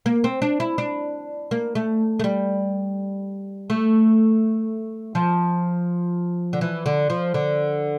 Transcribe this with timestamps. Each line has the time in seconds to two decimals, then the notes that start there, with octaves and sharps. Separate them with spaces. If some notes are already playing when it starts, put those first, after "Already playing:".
0.06 A#3
0.24 C4
0.42 D4
0.60 E4
0.78 D4
1.51 A#3
1.75 A3
2.20 A3
2.24 G3
3.70 A3
5.15 F3
6.53 D3
6.61 E3
6.86 D3
7.10 F3
7.34 D3